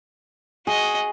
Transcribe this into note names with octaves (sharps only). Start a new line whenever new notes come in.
F#4 G#4 D#5